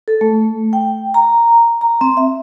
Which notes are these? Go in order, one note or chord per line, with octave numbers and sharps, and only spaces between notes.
A4
A3
G5
A#5
A#5
C4
E5